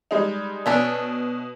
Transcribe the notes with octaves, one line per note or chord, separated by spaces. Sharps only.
G3 G#3 D#4
B2 A3 C#4 D4